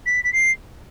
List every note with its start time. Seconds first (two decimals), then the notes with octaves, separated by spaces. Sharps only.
0.06 B6
0.24 B6
0.33 C7